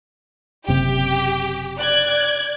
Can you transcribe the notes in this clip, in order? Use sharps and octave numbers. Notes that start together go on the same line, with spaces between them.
F#1 C3 G4
D5 F#6 G#6